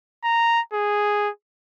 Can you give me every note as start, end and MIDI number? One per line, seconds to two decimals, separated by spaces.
0.24 0.60 82
0.73 1.30 68